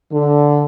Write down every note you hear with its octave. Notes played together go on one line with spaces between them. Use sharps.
D3